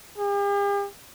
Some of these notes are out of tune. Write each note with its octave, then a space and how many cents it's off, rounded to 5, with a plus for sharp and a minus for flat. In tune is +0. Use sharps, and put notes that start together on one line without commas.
G4 +45